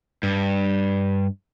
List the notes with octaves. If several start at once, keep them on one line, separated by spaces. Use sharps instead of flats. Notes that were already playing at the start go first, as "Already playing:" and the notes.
G2